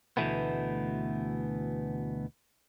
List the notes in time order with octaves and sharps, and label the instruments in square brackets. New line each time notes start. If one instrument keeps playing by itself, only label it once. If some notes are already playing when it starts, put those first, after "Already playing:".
[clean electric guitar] D2 B2 D#3 E3 A3 B3